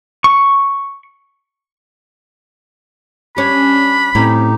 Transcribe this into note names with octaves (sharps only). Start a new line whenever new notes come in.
C#6
G3 C#4 D4 B5
A2 C4 C#4 D#4 G4